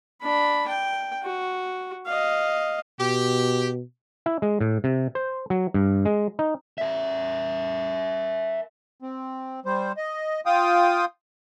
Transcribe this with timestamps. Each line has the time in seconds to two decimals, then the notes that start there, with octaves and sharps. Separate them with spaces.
0.22 D4 B5
0.68 G5
1.23 F#4
2.06 D#5 F5
3.00 B2 G4
4.26 E4
4.42 G#3
4.61 A2
4.84 C3
5.15 C5
5.50 F#3
5.74 G2
6.06 G#3
6.39 D#4
6.78 A#4 E5
9.02 C4
9.65 G3 C5
9.97 D#5
10.46 F4 F5 G5 D#6